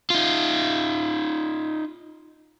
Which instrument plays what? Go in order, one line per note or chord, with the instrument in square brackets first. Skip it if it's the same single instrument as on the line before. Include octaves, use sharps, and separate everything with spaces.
[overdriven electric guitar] D#4 F4